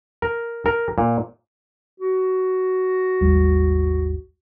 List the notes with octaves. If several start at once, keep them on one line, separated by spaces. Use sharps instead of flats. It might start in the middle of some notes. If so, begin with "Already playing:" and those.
A#4
A#4
A#2
F#4
G#1 D#2 G3